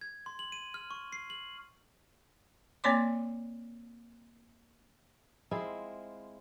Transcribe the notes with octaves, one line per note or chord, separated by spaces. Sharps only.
G#6
C6
F#7
D#7
F6
C#6
C7
F#7
A#3 C4 C#5 D5 C6 D6
G#3 C4 E4 F4